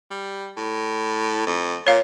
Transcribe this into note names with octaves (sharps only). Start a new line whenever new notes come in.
G3
A2
F2
A#2 C#5 F5